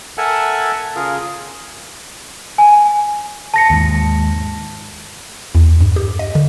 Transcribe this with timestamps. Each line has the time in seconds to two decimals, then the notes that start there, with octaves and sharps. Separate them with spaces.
0.18 A4 A#4 E5 F#5 G#5 A5
0.96 C#3 F4 G#4 A#4
2.58 G#5
3.54 A5 A#6 C#7
3.70 D#2 G#2
5.55 E2
5.81 G2
5.96 G4
6.19 D#5
6.35 D3